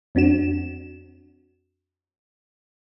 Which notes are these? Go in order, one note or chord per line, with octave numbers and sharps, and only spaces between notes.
F2 C4 D4 F#4 E7